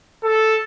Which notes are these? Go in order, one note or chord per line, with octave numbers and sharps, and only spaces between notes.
A4